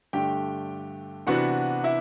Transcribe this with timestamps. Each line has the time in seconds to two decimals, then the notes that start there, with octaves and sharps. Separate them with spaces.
0.13 G2 D3 A3 D4 G4 G5
1.27 C3 E3 B3 D4 F#4 F#5
1.84 E4 E5